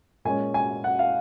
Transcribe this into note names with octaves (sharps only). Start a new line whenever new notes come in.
A#2 G#3 C#4 G#5
G#5
F#5
F5